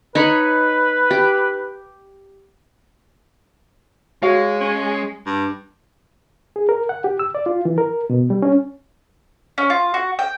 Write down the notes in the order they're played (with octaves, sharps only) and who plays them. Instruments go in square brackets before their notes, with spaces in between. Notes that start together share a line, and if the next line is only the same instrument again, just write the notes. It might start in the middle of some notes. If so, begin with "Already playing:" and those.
[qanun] D#4 C#5 B5 [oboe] B4
[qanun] G4
[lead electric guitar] G#3 [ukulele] F#4 C#5 F5
[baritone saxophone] C#4
G2
[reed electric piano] G#4
A#4
F#5
G4
E6
D5
F4
E3
A#4
B2
G3
C#4
[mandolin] C#4
F4
F#4
G5